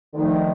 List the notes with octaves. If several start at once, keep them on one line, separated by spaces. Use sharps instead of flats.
D2 D3 D#3 F3 A3